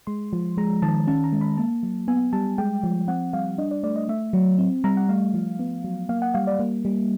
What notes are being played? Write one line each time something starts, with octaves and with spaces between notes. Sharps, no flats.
G#3 C6
F3
G#3 A#5
D#3 A5
C#4 A5
A#5
G#3
B5
A#3 A5
F#3
B3 G#5
G3 A5
G#3 G5
F3
C4 F#5
G3 F5
D4 D#5
D5
A3 D5
D#5
A3 E5
F#3
C4
G3 A#5
F#5
A3 F5
F3
B3
F#3
A#3 F5
F#5
G3 F5
D5
A#3
G3